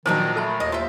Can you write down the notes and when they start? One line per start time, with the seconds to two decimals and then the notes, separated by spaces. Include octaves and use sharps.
0.06 A#2 D#3 F3 F#3 B3 D4 D#4 C5
0.36 A3 A4 A5 B5
0.60 D#2 D#5
0.72 F4 C5 E5